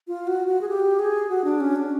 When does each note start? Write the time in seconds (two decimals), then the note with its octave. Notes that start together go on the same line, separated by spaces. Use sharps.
0.08 F4
0.27 F#4
0.47 F#4
0.61 G#4
0.69 G4
0.99 G#4
1.29 F#4
1.44 D4
1.60 C#4
1.76 D4